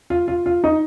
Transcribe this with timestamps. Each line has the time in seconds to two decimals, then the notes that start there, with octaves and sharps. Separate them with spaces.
0.10 F4
0.28 F4
0.46 F4
0.64 D#4